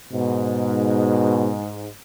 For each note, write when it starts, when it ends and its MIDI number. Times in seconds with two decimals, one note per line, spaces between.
0.13 1.89 44
0.13 1.60 47